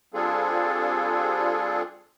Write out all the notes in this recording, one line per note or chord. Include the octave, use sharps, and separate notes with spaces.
G3 C4 D4 F4 G#4 A4